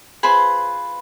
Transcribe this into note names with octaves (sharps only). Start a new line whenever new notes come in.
F4 G#4 B4 C5 B5